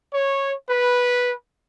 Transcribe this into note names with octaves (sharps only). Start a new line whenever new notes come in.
C#5
B4